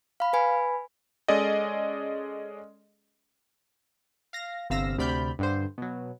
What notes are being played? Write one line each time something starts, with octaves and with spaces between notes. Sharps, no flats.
F5 B5
B4 G#5 B5
G#3 C#4 G#4 A4 D5 D#5
F5 A#6
G1 C3 F5 E6 A#6
D2 C3 D5 B5 F6 G6
G2 D3 C5
B2 F#3